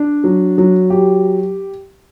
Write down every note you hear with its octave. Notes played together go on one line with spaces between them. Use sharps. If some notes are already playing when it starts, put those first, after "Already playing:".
Already playing: D4
F#3
F#3
G4